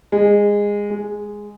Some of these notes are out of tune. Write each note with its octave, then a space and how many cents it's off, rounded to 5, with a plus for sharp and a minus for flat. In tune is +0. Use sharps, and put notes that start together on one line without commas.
G#3 -20
G#3 -5